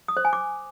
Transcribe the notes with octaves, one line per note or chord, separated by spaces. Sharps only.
D#6
C5
G#5
D6